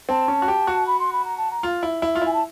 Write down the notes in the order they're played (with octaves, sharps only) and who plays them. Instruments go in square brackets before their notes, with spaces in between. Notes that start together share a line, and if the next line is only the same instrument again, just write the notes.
[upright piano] C4 [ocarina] A5
[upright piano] C#4
F#4
G4
F#4
[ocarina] B5
C6
B5
A#5
A5
A#5
[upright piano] F4
E4
E4
F4
[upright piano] E4 [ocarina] G#5
[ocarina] A5